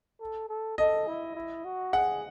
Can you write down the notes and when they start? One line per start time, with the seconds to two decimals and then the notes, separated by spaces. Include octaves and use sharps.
0.20 A4
0.49 A4
0.78 A4 D#5
1.07 E4
1.35 E4
1.65 F#4
1.93 G#4 F#5